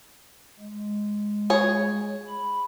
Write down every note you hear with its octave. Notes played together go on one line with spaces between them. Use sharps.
G#3
G#4 C#5
B5